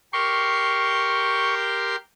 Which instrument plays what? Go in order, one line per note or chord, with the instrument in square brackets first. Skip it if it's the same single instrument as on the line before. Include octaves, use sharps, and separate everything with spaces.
[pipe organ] G4 A#4 C6 [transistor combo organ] C#6